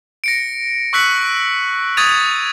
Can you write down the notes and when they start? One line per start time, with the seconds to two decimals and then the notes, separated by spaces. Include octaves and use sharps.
0.24 A#6 C#7 D7
0.93 C#6 E6 F#6 B6 C#7 F#7
1.97 C#6 D#6 G#6 A6 D#7 F7